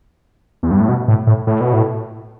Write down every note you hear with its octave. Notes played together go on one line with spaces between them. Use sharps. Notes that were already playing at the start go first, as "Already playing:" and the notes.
E2
G2
A2
B2
A2
A2
A2
B2
A2